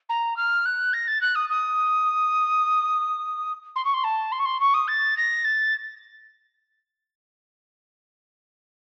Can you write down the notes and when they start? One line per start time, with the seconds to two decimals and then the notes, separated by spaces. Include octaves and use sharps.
0.09 A#5
0.36 F6
0.65 F#6
0.93 A#6
1.07 A6
1.21 F#6
1.35 D#6
1.49 D#6
3.75 C6
3.84 C#6
3.93 C6
4.04 A5
4.32 C6
4.39 C#6
4.45 C6
4.60 C#6
4.74 D#6
4.87 A6
5.17 A#6
5.44 A6